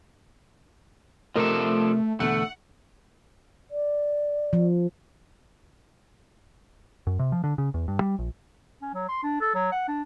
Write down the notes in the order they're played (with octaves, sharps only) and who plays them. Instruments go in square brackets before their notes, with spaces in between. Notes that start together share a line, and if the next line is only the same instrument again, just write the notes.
[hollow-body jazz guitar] C3 A#4 D#5 [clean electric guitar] F3 D4 A4 [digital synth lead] A3
[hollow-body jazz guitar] E2 B2 D3 [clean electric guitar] A3 [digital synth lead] F#5
[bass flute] D5
[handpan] F3
[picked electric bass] F#2
C3
F3
D3
C#3
E2
G2
G3
A#1
[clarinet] C#4
F#3
C6
D4
A4
F#3
F#5
D4